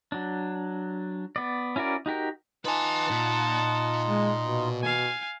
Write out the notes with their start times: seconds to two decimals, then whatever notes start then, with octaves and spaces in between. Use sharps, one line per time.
0.12 F#3 D4
1.36 B3 D5
1.76 C#4 E4 F#4 A#4 D5
2.06 D#4 F#4 G4 A#4
2.65 D#4 F4 B4 D#5 F#5 G#5 A5
3.10 A#2
4.06 G#3
4.42 B2
4.82 F5 G#5